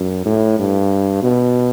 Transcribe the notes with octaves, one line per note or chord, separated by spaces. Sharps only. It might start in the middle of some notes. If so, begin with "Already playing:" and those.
Already playing: F#2
A2
G2
B2